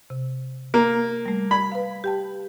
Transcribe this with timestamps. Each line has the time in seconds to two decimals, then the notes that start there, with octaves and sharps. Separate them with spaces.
0.10 C3
0.74 A#3
1.26 G3 A3
1.51 B5 G#6
1.72 B4 F5
2.04 G4 G5 A5